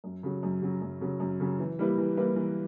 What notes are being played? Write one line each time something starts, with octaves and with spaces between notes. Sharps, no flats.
F#2
C#3 F#3
F#2
C#3 F#3
F#2
C#3 F#3
F#2
C#3 F#3
E3
G3 A#3 E4 B4
E3
G3 A#3 E4 B4
E3